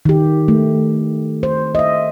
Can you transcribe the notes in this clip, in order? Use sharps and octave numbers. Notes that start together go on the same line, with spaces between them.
D#3 G4
A3
C5
D#5 E5